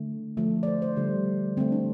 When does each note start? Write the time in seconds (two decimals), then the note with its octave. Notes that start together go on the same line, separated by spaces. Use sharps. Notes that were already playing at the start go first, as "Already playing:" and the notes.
Already playing: D3 A3
0.37 D3 F3 A3
0.63 D5
0.67 C5
0.82 C5
0.97 D3 G3
1.57 D3 C4
1.60 A3
1.72 D4